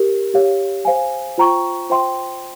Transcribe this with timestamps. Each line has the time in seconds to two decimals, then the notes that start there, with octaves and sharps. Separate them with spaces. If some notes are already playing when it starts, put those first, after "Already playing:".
Already playing: G4 A#4
0.34 G4 C#5 F5
0.85 C5 F5 G#5
1.38 F4 C5 G5 A#5 C#6
1.90 F4 C5 E5 G5 C6